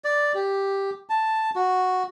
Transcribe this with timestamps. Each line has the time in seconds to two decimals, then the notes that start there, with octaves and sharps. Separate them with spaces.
0.04 D5
0.35 G4
1.09 A5
1.55 F#4